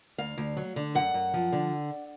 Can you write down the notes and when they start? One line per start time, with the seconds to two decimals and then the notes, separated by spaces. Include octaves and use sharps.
0.18 D2 F5
0.38 D2
0.57 F#3
0.76 D3
0.95 F#2 F#5
1.14 F#2
1.34 F3
1.52 D3